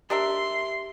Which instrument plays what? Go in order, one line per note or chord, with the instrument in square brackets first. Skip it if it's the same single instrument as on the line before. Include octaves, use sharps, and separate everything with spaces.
[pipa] D4 A#4 E5 [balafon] G4 [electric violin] C6